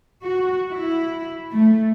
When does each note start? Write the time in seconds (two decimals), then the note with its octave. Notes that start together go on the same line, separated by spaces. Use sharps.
0.22 F#4
0.70 E4
1.51 A3